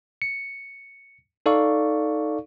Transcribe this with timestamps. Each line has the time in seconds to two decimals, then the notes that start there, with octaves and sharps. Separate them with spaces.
0.22 C#7
1.46 D#4 A4 D5 F5 C#6